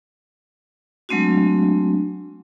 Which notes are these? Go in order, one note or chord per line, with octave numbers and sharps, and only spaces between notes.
F#3 G#3 A3 C4 D4 F#4